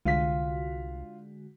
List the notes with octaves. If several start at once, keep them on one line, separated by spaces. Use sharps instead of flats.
C2 D3 G#3 F4 F#4 F5 B6